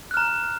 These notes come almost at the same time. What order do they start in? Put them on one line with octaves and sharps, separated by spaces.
F#6 F6 A#5